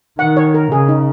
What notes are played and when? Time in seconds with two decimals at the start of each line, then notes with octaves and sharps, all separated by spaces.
0.19 D#3 F#5
0.37 C#5
0.54 A#4
0.71 C#3 G#4
0.89 D#4